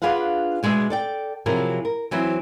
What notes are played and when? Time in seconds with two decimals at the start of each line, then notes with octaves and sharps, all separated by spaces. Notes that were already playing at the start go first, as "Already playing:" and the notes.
0.02 D4 F4 G#4 B4 F5 F#5
0.63 B2 G#3 D4 G#4 E5
0.90 A4 D5 G5
1.46 C3 F3 F#3 E4 G#4 A#4
1.85 A#4
2.11 E3 F#3 C4 E4 C5